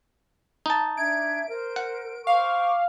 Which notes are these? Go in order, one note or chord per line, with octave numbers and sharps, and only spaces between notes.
D#4 A5
D4 E5 G#6 D7
A#4 C5
F#5
C5 F5 C#6 D6